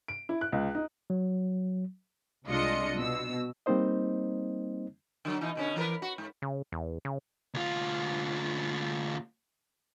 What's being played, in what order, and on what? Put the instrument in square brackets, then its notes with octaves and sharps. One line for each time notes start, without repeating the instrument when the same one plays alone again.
[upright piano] D7
E4
F#6
C#2
D#4
[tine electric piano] F#3
[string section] C2 G#3 D4 F4 D#5 C#7
B2 E6
[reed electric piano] G3 A#3 C4 D#4 C5 D#5
[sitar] D3 F#3
B2 E3 D#4
B2 D3 C#4
E3 A#4 B4
F#4
G#2
[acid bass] C#3
E2
C#3
[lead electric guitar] D2 F4